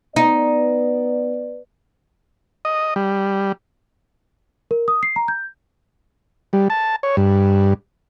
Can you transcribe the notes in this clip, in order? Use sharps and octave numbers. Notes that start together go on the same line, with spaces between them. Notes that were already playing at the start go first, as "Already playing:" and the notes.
B3 D#4 B4 D5
D#5
G3
A#4
D#6
C7
A#5
G6
G3
A5
C#5
G2